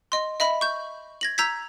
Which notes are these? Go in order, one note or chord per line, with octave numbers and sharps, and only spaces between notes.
D#5 C6
D#5 E5 B5
C#6 G6
G#6 A#6 F#7
A#5 E6 G6 G#6 B6